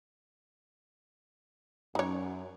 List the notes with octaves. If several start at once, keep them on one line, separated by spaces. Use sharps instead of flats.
F#2 D#4 C#5